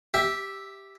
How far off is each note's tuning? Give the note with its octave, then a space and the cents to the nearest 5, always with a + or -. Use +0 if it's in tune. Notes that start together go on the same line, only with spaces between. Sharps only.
G4 +0 E5 +0